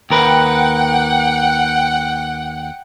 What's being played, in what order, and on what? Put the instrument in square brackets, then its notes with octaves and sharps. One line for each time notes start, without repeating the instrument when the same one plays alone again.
[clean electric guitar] D#2 A#4 B4 [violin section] F#5 G5